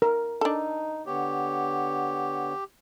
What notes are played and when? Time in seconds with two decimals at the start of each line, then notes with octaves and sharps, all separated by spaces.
0.02 A#4
0.41 D4 D#4 A4
1.06 D3 B3 G4 C#5